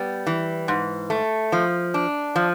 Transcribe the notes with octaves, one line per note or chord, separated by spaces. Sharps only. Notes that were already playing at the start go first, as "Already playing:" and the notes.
Already playing: G3 B3
E3
G#2
A3
F3
D4
F3